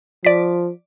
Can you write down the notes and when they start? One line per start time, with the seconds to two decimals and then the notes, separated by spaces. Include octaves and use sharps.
0.25 F3 D5 B6